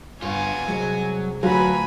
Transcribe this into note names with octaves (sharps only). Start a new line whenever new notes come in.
G2 B3 F4 G#5
C2 F#3 G#3
D2 F#3 F4 B4 G#5 B5